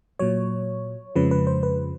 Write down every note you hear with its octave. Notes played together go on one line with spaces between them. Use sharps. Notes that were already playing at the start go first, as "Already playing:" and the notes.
A#2 F#3 C#5
F2 C#3 F3 G#3 B4
B4
C5
B4